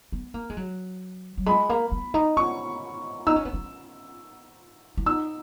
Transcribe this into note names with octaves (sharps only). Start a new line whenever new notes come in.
B3
A#3
G#3
F#3
F#3
G#3 B5
A#3
B3
D#4
C#4 C#6
D#4 E6
C#4
B3
C#4
E4
D#4 E6